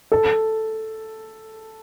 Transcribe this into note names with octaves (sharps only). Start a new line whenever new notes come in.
A4